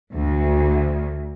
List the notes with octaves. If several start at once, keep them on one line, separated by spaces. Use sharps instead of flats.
D2